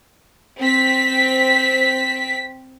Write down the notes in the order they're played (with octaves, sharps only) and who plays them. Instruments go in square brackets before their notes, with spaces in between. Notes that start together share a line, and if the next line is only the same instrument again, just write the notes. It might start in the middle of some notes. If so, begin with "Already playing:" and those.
[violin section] C4 B6